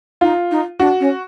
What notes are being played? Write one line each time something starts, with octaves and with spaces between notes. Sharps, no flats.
D#4 F4
D#4
D4 F#4
C#4